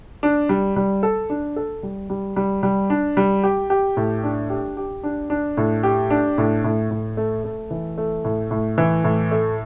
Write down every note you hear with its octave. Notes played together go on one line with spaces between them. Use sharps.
D4
G3
G3
A4
D4
A4
G3
G3
G3
G3
D4
G3
G4
G4
A2
D4
G4
G4
D4
D4
A2
G4
D4
A2
A2
A2
A3
A3
E3
A3
A2
A2
E3
A2
A3